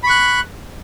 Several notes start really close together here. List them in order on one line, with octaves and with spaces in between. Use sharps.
B5 C#6 F#6